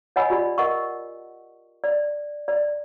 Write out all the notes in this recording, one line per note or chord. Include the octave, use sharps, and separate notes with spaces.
C#5 D#5 F#5 G#5 B5 E6
F4 G4 D5 B5
A#4 D#5 F#5 C#6
D5
D5